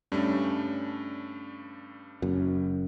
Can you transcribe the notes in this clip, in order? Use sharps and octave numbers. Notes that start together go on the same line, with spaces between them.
G2 G3 A3 C#4 D4
F#1 F#2